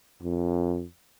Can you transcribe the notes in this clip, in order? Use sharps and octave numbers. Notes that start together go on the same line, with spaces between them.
F2